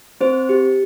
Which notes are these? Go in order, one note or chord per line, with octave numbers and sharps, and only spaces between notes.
C4 C5
G4